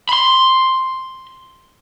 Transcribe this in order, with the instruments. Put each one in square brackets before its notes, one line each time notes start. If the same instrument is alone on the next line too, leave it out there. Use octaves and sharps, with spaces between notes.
[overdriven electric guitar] B5 C6